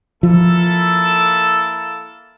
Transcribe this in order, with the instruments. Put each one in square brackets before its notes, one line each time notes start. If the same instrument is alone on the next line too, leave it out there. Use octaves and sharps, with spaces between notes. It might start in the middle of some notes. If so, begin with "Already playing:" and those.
[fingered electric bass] F3 [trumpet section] A#3 E4 A4